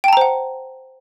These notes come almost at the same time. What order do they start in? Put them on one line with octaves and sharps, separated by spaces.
G5 A5 A#5 C5 F#5